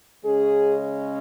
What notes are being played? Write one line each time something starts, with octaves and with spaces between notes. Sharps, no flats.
C#3 G#3 C#4 G#4